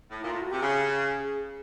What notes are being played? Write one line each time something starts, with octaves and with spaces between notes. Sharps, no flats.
A2
A#2 E4
A2 F4
F#4
C3 G4
C#3 G#4